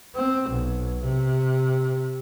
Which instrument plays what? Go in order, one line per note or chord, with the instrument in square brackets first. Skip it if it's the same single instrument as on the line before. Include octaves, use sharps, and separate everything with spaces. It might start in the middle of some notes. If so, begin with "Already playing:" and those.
[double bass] C4
B1
C3